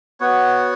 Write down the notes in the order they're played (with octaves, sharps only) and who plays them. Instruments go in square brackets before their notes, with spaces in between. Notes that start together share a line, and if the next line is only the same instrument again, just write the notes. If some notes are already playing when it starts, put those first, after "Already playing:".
[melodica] B3 F#4 C#5